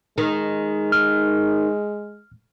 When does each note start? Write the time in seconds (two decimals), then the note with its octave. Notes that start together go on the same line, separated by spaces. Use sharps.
0.18 D#3 G#3
0.92 F6